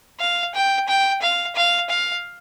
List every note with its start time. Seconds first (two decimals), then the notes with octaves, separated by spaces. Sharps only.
0.20 F5
0.55 G5
0.88 G5
1.22 F5
1.56 F5
1.89 F5